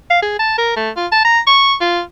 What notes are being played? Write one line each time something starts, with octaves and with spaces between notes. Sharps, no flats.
F5
G#4
A5
A#4
A3
F4
A5
A#5
C#6
F4